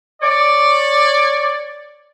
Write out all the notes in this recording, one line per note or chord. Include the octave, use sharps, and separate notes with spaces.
C#5 D5